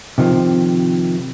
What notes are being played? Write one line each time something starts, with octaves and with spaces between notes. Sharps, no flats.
C3 D#3 F3